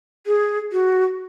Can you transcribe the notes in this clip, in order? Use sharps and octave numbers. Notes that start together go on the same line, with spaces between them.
G#4
F#4